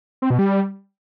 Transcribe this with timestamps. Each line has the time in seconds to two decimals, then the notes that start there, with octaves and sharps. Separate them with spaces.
0.22 C4
0.30 B2
0.39 G3